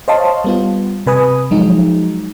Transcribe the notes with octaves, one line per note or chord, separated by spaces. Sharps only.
C5 C#5 D#5 F5 A5 C6
G3 B3 F4
C3 B4 G#5 D#6
F3 F#3 G#3 D#4